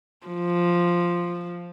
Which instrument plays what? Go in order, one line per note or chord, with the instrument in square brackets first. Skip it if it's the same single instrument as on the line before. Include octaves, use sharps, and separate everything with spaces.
[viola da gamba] F3